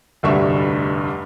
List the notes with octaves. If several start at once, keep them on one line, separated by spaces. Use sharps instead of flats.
F1 D2 G2 G3 E5 C#6